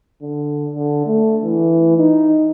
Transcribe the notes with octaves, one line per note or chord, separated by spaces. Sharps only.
D3
D3
A3
E3
D#4